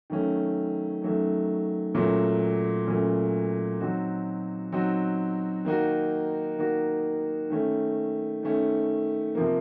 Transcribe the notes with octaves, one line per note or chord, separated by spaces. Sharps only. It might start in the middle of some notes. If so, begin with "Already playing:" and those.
D#3 F#3 A3 C#4
D#3 F#3 A3 C#4
A#2 F#3 A3 C#4
A#2 F#3 A3 C#4
F#3 C4 D#4 F#4
F#3 C4 D#4 F#4
D#3 A#3 D#4 F#4
D#3 A#3 D#4 F#4
D#3 A3 C#4
D#3 A3 C#4
C3 F3 A#3